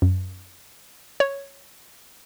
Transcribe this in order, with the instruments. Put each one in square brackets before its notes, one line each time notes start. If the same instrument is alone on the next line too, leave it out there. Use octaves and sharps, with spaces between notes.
[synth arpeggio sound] F#2
C#5